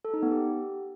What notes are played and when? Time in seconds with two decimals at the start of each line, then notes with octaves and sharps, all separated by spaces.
0.05 A4
0.14 D#4
0.23 B3
0.32 G4